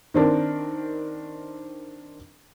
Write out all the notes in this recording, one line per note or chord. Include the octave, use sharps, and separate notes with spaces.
D#3 C4 D4 A#4